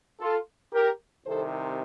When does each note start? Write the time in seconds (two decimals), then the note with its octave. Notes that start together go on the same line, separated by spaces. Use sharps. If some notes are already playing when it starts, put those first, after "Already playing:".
0.20 F4 A4
0.73 G4 A#4
1.25 C2 C3 D#3 A4 C5